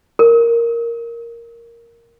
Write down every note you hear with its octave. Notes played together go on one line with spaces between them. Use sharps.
A#4